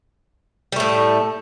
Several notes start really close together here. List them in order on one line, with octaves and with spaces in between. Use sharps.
G3 A3 A2